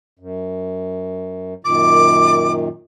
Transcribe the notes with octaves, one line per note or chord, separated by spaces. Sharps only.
F#2
F#2 A#2 D#3 D6